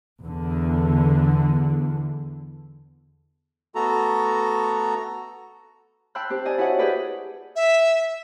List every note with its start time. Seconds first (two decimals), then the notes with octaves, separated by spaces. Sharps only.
0.20 E2 D3
3.75 A3 B3 F#4 A4 A#5
6.15 G5 A5 B5 C6 E6 F#6
6.30 C4 G4 C5
6.45 D5 D#5 G#5 A5
6.58 E4 F#4 C#5 D#5 F#5
6.79 G4 G#4 B4 D5
7.56 E5